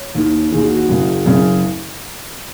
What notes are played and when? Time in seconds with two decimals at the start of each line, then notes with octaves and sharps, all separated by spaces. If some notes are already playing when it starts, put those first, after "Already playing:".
Already playing: C#5
0.15 D#2 D#3
0.52 D#2 D#3 G#4
0.64 F#4
0.76 F#4
0.87 F#1 F#2 C#3
1.25 F#1 F#2 C#3